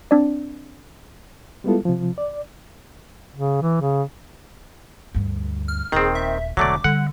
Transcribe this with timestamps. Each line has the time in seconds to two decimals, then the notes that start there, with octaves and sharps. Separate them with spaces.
0.11 C4 D4 D5
1.64 G3 G#3 B3 E4 F4 A4
1.85 C3 F3
2.18 D5
3.35 C#3
3.62 E3
3.81 C#3
5.15 D2 G2
5.68 F6
5.92 D#1 D#3 C4 G#4
6.15 E5
6.57 E1 D3 F#3 A3 D5 D6
6.84 D3 G3 F#5